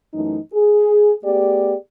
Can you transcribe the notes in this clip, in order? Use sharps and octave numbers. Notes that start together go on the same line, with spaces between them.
F#2 E3 A3 D#4
G#4
A3 B3 G4 G#4 D5